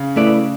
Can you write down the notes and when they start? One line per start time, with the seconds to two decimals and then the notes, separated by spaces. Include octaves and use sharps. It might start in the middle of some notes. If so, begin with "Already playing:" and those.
Already playing: C#3
0.16 A3 E4 B4 D5